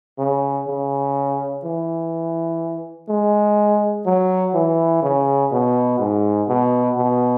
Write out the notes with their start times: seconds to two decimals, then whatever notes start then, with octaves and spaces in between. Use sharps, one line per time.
0.18 C#3
0.67 C#3
1.64 E3
3.09 G#3
4.05 F#3
4.54 E3
5.02 C#3
5.52 B2
5.99 G#2
6.48 B2
6.97 B2